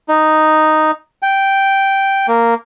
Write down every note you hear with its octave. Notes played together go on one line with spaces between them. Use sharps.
D#4
G5
A#3